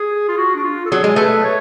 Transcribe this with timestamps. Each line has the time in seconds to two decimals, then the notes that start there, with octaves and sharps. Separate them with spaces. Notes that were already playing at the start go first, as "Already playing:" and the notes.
Already playing: G#4
0.28 F4
0.37 F#4
0.55 D4
0.64 F4
0.86 A4
0.90 F#3 G#4
1.04 G#3
1.16 A3 B4
1.43 C#5